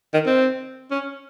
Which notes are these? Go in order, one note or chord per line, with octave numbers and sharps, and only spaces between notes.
D#3
C4
C#4